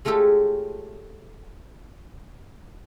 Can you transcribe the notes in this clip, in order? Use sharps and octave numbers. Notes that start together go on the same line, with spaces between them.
G#3 A3 F4 G4 A4 C#5